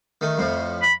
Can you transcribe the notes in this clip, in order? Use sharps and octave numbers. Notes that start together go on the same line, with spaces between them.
D#3 A3
F2 A2 F3
B5